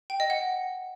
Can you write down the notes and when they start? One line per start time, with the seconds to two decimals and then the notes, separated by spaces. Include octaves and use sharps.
0.10 G5
0.20 D#5
0.30 F#5